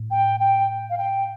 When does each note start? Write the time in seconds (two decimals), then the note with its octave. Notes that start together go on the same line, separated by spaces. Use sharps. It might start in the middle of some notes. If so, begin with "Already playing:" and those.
Already playing: A2
0.11 G5
0.40 G5
0.90 F5
0.98 G5